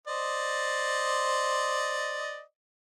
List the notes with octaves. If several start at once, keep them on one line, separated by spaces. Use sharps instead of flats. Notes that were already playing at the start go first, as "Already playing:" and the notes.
C5 D5 D#5